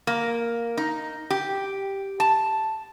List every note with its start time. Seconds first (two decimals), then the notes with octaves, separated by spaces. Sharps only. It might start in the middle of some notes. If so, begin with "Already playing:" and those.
0.07 A#3
0.77 D#4
1.30 G4
2.20 A5